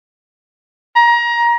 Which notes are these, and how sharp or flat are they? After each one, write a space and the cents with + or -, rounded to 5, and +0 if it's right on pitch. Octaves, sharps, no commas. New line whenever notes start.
A#5 +25